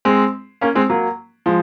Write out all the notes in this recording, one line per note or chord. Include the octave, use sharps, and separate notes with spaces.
G#3 C4
A#3 C#4
G#3 C4
F#3 A#3
F3 G#3